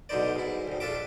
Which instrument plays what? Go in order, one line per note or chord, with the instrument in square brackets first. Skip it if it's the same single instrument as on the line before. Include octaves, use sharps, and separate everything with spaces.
[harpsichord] B1 B2 D3 D#4 C5 D5
G#2 E4
D2 A2
A#1 D4 F4 A4 E5 D6